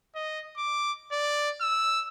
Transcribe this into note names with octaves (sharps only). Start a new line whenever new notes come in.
D#5
D6
D5
E6